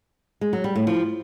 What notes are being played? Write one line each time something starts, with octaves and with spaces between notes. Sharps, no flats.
G#3
F#3
G3
A2
F3